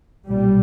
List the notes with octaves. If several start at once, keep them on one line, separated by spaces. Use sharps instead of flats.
B1 A#2 G3